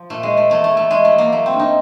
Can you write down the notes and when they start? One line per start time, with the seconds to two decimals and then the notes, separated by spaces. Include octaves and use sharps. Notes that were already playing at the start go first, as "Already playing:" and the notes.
Already playing: F3
0.10 A#2 A3
0.23 G#3
0.30 F3
0.37 A3
0.50 E2 A3
0.64 A3
0.71 E2
0.77 A3
0.91 E2 G#3
1.05 A3
1.12 E2
1.18 A#3
1.32 F#3 A3
1.46 C4
1.53 G2
1.59 D#4